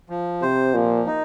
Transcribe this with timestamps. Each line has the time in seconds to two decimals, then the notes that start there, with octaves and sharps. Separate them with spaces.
0.10 F3
0.42 C3 C5
0.74 A#2 F3
1.07 D#4